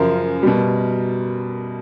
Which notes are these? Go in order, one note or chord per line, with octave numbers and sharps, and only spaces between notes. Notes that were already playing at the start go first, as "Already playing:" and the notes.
Already playing: F#2 C#3 F3 A#4
B2 G3